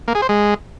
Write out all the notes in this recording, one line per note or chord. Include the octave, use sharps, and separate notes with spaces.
A#3
G#4
C5
G#3